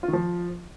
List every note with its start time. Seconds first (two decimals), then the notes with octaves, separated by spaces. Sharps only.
0.03 F4
0.08 D#3
0.13 F3